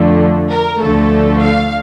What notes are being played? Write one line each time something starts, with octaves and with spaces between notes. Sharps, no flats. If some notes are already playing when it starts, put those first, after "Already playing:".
Already playing: F2 D3 F3 A3
A#4
D2 D3 F3 A3 A4
F5